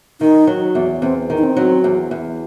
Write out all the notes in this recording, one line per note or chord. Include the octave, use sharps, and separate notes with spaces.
D#3 D#4
F#3
E2
E2 C4
D#3
D#4
C4
F#3
E2
E2